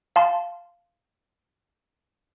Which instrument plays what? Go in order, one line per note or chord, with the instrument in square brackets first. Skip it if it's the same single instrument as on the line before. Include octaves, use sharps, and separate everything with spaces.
[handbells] F5 A5 C6